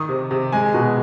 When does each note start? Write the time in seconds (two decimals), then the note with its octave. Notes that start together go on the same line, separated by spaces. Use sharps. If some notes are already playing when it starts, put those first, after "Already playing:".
Already playing: D#3 D#6
0.09 C3
0.31 C3
0.52 G#3 G#5
0.74 B2